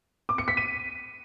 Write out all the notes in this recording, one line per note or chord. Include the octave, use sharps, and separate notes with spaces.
D6
C#7
B6
D#7